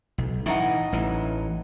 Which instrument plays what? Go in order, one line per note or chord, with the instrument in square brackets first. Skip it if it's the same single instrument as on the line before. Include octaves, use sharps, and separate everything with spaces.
[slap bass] B1
[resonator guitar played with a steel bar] A2 D#4 F#5 [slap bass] E3
[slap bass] A1 E3